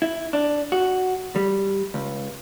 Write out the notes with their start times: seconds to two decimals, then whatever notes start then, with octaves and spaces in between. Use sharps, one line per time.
0.02 E4
0.33 D4
0.72 F#4
1.36 G3
1.94 C#2